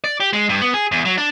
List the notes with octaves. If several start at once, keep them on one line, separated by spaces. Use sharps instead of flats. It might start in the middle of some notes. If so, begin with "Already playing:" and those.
D5
G4
G#3
G2
B3
G#4
E2
F#3
D4